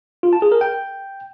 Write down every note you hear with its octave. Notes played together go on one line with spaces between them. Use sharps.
F4
A5
G#4
A#4
G5